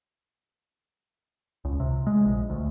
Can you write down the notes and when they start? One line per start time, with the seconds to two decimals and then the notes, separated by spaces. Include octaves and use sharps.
1.65 C#2
1.80 C3
2.07 G#3
2.25 A#1
2.50 D2